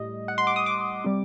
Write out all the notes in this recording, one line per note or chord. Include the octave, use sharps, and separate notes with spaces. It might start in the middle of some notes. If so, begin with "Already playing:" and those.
Already playing: A2 G3 D#5
F#5
C6
D6
D#6
D6
C3 G3